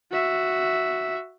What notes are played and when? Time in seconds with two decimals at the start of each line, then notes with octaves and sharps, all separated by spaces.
0.11 F#4 E5